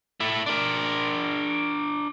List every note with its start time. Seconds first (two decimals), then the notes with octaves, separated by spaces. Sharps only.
0.20 A3 E4
0.46 D4 A#4